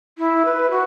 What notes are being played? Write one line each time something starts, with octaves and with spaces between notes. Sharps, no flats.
E4
B4
F#4